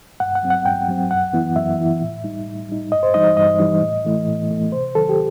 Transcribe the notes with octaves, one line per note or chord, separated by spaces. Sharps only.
G2 F#5
F#5
F#3 C4
F#5
G2 G5
F#3 C4
F#2 F#5
E3 B3 E4
F#2 E5
E3 B3 E4
A2
G3 D#4
A2
G3 D#4
G2 D#5
C5
E3 G3 D#4 D#5
G2 D#5
E3 G3 D#4
A2
E3 A3 E4
A2
E3 A3 E4
C3 C5
D#3 F#3 A4
G4